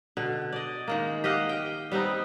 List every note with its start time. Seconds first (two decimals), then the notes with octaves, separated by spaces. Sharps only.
0.17 B2 D3
0.52 D5 D#5
0.88 D#3 G#3 A#3
1.24 G4 D#5 F5 F#5
1.49 D#5 G5
1.92 G3 B3 C4 D#4